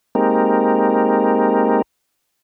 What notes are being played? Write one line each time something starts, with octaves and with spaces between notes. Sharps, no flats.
G#3 A#3 C4 D#4 G4 A#4